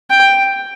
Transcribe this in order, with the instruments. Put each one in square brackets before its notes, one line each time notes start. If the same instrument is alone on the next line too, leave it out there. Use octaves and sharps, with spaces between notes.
[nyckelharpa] G5